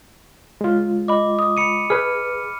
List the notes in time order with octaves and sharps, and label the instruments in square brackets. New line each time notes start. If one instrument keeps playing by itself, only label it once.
[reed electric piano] G#3 F4
[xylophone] D#5 B5 [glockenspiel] D6
[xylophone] D#6
[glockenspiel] B5 C#7 D#7
[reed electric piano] G#4 B4 [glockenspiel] F6